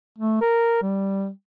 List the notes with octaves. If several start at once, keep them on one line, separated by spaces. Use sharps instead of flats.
A3
A#4
G3